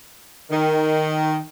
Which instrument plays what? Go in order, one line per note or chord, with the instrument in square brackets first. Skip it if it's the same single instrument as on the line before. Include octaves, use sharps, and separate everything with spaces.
[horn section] D#3